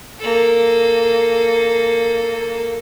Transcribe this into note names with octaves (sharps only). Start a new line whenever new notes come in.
A#3 A4